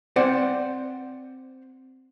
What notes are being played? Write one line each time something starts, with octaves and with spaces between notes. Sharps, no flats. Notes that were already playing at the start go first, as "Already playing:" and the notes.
C4 C5 D5 F#5